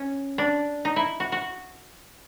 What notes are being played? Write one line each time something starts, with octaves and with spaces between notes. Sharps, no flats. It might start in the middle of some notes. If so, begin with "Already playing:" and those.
Already playing: C#4
D4
D#4
E4
F#4
F#4